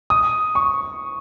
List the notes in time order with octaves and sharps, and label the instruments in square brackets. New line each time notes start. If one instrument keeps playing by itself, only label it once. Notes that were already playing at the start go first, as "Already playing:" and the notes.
[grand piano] D#6
C#6